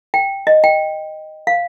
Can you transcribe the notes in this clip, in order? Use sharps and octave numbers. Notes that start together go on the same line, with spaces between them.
G5
D#5
G5
F5